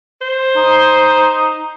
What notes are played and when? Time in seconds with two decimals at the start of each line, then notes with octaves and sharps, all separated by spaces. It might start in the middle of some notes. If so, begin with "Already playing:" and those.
0.22 C5
0.56 D#4